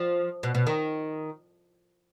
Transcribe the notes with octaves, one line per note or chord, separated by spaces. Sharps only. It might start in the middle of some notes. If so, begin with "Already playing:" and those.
Already playing: F3
B2
B2
D#3